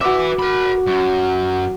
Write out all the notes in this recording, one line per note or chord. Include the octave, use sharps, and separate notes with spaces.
F#4 B4 E5 D6
A#4 B5
F#2